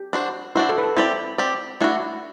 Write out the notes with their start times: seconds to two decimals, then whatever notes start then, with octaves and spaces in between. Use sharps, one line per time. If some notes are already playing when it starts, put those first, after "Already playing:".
Already playing: G4
0.13 D4 F#4 C5
0.55 D4 E4 F#4 C5
0.69 A4
0.78 B4
0.83 A4
0.97 C4 E4 G4 D5
1.38 C4 G4 D5
1.81 A3 D4 E4 F#4